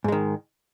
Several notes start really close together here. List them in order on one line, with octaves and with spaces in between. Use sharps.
G#2 G#3 D#3